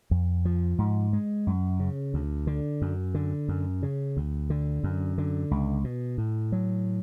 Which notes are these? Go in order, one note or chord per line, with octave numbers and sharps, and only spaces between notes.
F2
F3
G#2
G#3
F#2
C#3
D2
D3
F#2
D3
F#2
C#3
D2
D3
F#2
D3
C#2
B2
A2
F#3